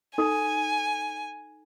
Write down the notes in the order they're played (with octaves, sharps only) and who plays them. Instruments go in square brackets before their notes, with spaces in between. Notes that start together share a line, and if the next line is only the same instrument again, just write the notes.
[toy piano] D#4 A4 [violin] G#5